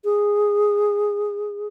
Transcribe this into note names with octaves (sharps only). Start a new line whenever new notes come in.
G#4